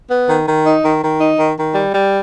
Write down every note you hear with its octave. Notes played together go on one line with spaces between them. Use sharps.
B3
D#3
D#3
D#4
D#3
D#3
D#4
D#3
D#3
G3
G3